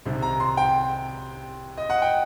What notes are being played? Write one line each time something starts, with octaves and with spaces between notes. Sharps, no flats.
C2 C3 D#3
A#5
C6
G5
D#5
F#5
G5